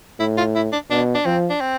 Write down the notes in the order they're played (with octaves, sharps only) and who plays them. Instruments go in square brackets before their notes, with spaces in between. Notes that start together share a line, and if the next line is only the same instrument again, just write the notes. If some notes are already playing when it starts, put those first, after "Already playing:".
[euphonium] A2 [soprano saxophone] E4
[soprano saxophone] F4
E4
D4
[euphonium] B2 [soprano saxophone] D4
[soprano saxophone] D4
[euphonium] F3 [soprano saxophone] C4
[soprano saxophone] D4
C4